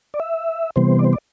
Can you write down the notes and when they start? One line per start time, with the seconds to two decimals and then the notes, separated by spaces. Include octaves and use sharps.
0.14 D5
0.20 E5
0.76 C3 E3 G3 B3 C5
0.99 D5
1.04 C5
1.13 D5